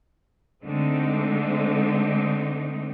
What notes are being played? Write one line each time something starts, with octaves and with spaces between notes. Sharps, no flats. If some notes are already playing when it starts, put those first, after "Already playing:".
D3 G#3 A3 C4 D#4